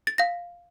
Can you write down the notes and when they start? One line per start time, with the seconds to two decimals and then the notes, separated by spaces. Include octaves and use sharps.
0.07 A6
0.18 F5 A#6